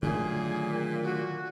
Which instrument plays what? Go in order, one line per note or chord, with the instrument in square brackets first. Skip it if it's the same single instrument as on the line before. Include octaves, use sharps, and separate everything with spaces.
[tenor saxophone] A#2 [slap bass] D3 F#3 A3 [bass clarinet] D#3 [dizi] G#4
[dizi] F#4